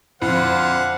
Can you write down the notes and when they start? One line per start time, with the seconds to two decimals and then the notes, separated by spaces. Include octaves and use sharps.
0.22 F2 D3 C5 F5 F#5